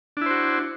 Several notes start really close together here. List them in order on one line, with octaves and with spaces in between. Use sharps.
D4 E4 C5 F#4